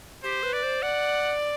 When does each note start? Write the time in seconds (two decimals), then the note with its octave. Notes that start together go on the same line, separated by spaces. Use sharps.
0.23 G4 C5
0.43 B4
0.53 D5
0.63 C5
0.82 D5 F#5